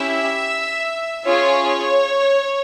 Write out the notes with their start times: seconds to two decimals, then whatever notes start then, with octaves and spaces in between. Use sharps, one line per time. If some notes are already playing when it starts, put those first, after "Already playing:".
Already playing: C#4 E4 G4 E5
1.26 C#4 F4 G#4 C#5